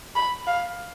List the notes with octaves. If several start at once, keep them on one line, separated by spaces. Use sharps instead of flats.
B5
F5